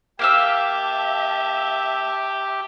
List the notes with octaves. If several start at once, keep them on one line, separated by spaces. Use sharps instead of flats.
A#3 G4 E5 F5 A5 E6